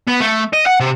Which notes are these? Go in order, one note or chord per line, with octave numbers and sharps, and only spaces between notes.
B3
A3
D#5
F#5
C3